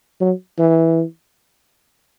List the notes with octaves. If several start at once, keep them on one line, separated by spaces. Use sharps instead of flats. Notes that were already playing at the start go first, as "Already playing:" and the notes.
F#3
E3